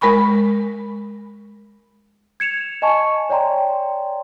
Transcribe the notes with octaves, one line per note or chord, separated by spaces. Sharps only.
G#3 A#4 G#5 B5 C#6
G#6 C#7 E7 F7
D#5 G#5 A5 C#6
C#5 D5 G5 A#5 C6